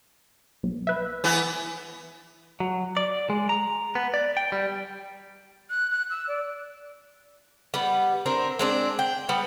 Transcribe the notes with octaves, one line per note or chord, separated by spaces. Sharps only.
B1
B4 E5
E3 B3
F#3
D5
G#3
A#5
B3
D5
G5
G3
F#6
F#6
E6
D5
G3 B3
C4 D4 A#4
G#3 C4 D4
G5
G3 B3